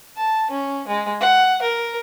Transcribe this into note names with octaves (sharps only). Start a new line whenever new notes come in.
A5
C#4
G#3
F#5
A#4